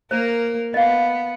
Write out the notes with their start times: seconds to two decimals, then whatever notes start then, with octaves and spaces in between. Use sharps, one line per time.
0.11 A#3 A#4 C5
0.74 B3 D#5 F5